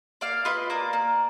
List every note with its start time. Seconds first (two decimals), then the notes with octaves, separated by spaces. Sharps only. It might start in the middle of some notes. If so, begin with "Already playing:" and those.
0.21 A#3 D5 F5
0.45 F4 B4 D#5
0.70 A#3 A#4 D5
0.93 A#3